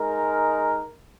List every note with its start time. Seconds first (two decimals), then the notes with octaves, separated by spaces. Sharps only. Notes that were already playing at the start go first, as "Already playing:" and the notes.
Already playing: G#3 D#4 A#4